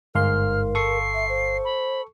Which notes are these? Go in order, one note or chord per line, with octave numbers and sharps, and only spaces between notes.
G1 G#2 A#4 F5 C6 F6
A4 C#6 C7
E5
C5
B5